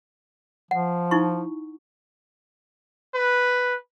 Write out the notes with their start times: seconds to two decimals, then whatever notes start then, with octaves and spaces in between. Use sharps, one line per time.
0.71 F3 F#5
1.11 D#4 E4 C#6
3.14 B4